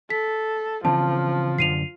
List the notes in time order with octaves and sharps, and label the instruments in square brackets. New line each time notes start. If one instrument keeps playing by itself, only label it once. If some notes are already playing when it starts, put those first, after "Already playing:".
[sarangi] A4 [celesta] B6
[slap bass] C#3 E3 C4 [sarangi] F3 [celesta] A5
[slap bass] F#2 D3 [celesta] C7 D#7 F7